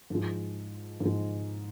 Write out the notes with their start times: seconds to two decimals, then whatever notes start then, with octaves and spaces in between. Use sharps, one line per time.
0.10 G#2 F3 G#3
1.00 G#2 F3 G#3